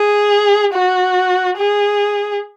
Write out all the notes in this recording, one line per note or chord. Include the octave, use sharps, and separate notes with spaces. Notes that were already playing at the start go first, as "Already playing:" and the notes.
Already playing: G#4
F#4
G#4